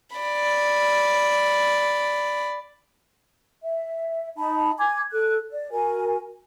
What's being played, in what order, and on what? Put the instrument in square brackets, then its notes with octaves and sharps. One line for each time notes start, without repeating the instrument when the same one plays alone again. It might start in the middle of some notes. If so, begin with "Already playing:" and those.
[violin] D5 B5
[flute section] E5
D#4 A5 B5
G#5 D6 G#6
A4 F#6
D5
F#4 A#4 G#5